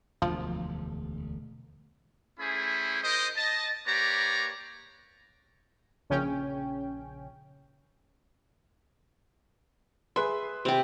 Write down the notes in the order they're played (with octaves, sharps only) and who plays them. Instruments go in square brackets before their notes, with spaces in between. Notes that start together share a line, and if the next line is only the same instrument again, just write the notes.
[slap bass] E1 D2 [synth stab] F3
[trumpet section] A3 C#4 E4 G#4 C5 B5
D#4 A#4 C5 D#5
D#5 A5
A#3 G4 B4 C#5 D5 A#5
[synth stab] A#1 C#3 C#4 G5
[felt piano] G#4 B4 C6 [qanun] E5
[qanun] C3 G4